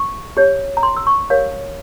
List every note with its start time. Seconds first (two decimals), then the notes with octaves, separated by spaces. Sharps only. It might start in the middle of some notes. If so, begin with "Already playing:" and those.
Already playing: C#6
0.37 G4 C#5
0.77 A#5
0.83 C6
0.97 E6
1.07 C#6
1.30 G4 A#4 C#5 F5